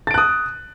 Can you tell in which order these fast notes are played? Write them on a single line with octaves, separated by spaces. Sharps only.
A6 D7 F#6 D#6